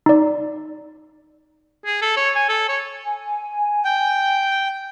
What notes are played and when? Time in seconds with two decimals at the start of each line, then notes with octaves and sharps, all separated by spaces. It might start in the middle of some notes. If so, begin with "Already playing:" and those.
0.06 D#4 D5
1.86 G#4
2.02 A4
2.17 C#5
2.35 G#5
2.49 A4
2.69 C#5
3.05 G#5
3.84 G5